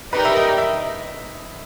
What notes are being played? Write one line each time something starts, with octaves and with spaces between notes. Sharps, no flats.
D#4 G4 A#4 B4 D5 G5
E5
D#5
E5